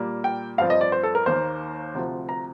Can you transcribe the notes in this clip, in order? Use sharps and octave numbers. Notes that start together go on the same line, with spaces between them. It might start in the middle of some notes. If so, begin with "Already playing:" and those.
Already playing: A#2 G3 A#3
G5
G2 F3 C4 F5
D#5
D5
C5
A4
A#4
D#2 D#3 A#3 C5
D2 C3 F3
A#5